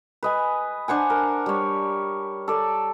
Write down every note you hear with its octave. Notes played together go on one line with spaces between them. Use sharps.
B4 D#5 G#5
D4 C5 F#5 G#5
A#4
G3 C#5
A4 D5